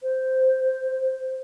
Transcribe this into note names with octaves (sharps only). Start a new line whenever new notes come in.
C5